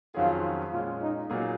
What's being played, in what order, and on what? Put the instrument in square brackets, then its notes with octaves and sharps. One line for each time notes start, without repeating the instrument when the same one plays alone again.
[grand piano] F2 D#3 F#3 C#4 G#4 [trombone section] F4
[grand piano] A#2 G#3 C#4 [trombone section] F4
[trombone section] D#4
[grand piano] A#2 F#3 A#3 D#4 G#4